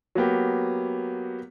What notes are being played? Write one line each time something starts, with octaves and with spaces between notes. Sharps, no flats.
F#3 A#3 B3 G4